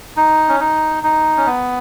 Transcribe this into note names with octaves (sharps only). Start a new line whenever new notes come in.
D#4
C#4
D#4
D#4
C#4
B3